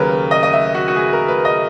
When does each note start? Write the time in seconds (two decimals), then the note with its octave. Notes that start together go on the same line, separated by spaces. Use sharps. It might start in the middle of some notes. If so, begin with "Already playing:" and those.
Already playing: D#2 C#3 F#3 A#4 B4
0.31 D#5
0.43 D#5
0.53 E5
0.75 F#4
0.88 F#4
0.96 G#4
1.13 A#4
1.28 B4
1.45 D#5